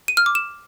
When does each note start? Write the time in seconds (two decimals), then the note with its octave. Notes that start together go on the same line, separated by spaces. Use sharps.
0.08 D#7
0.17 F6
0.26 D6
0.35 E7